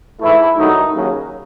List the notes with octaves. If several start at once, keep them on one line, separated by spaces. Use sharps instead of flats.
G#2 E3 A3 E4
G2 D#3 F#3 A3 D#4
D#2 C#3 F#3